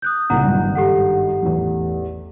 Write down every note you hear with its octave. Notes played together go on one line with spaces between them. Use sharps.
D#6 F#6 G6
C2 A#2 C#3 F#5 A#5
G#1 G2
G4 A4 F#5
A1 E2